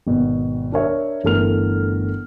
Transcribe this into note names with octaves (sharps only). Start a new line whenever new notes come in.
G#1 B2
D4 A#4 C#5 E5
G1 E3 A3 A#4 F6 F7